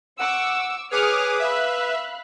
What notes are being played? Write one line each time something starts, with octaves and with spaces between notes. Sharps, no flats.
F#5 C#6 D6 E6
G#4 B4 C#5 D6 D#6 F6 C#7
E5 F5 B5 F#6